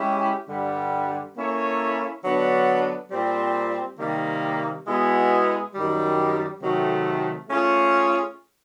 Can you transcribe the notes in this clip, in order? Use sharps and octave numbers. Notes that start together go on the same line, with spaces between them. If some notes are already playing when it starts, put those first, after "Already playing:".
Already playing: G#3 C#4 E4 G4
G2 D3 G3
A#3 C#4 E4 A4 C#5
D3 F#3 B3 D4
A#2 G3 C4
C3 D#3 G3 A#3
B2 G#3 B3 E4 G#4
F#2 D#3 G3
C3 D#3 F#3 A3
A3 C#4 F4 G#4 C#5